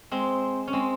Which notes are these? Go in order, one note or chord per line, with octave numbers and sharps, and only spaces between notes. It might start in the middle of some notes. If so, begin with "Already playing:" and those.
G#3 C4
C#4
G#3 C4